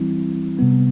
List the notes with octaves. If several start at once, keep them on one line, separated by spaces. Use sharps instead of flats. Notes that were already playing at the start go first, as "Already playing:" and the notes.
Already playing: E3 G3 C4 E4
C3 G3 B3